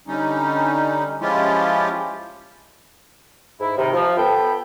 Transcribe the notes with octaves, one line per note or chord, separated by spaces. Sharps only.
D3 G3 C#4 D#4
F3 G#3 C#4 E4 F4 G4
G#2 E4
C3 D#3
F3
B3 A4 G5 B5